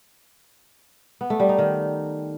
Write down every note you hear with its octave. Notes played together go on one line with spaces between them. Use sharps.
B3
A3
G3
D#4
D#3